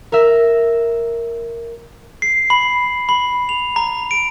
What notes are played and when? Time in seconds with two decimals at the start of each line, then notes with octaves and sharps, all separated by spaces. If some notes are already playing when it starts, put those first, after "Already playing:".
0.12 A#4 E5
2.22 C7
2.50 B5
3.09 B5
3.49 F7
3.76 A#5
4.11 D7